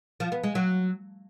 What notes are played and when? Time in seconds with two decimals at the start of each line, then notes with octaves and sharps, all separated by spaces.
0.20 F3
0.32 B3
0.44 G#3
0.55 F#3